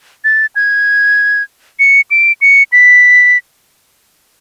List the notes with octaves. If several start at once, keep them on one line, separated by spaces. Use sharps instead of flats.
A6
G#6
C#7
D7
C#7
B6